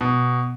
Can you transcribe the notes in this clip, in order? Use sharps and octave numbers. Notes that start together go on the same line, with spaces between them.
B2